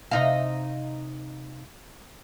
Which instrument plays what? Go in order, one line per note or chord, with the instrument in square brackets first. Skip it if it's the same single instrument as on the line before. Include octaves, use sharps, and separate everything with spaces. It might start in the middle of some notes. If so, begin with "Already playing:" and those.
[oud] C3 D#4 F5